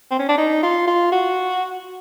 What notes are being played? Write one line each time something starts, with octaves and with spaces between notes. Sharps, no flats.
C4
C#4
D4
D#4
F4
F4
F#4